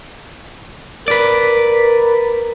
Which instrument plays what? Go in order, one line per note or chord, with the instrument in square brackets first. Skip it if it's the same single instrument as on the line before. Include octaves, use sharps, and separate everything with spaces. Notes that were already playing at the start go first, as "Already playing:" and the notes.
[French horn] A#4 [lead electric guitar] B4 D5